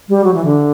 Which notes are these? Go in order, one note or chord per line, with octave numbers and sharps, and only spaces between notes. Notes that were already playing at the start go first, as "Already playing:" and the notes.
G3
F#3
E3
D3